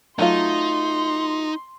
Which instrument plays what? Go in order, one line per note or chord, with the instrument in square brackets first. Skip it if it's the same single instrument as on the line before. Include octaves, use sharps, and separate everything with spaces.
[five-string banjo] F#3 A3 F4 [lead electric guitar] D#4 [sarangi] C6